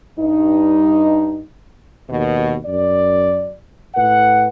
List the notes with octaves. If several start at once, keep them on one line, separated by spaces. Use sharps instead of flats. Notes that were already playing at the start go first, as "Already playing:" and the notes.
G2 D#4
D#2 B2
F#2 D5
A2 B4 F#5